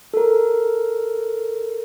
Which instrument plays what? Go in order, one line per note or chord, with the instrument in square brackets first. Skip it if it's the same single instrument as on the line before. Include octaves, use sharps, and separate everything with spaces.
[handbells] A4 A#4